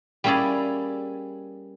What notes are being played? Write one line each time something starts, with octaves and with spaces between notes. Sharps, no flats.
G3 A#3 C#4 E4 G#4 D5